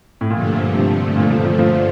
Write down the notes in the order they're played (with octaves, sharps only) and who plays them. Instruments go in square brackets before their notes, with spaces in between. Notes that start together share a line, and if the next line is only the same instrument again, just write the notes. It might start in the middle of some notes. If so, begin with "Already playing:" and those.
[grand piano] A2
[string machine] G2 D3 F3 A3 [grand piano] A#2
[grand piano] A#2
C3
A#2
F3
F3
F3